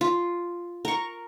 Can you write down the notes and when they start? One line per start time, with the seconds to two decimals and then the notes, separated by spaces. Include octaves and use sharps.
0.01 F4
0.85 A#4 C#6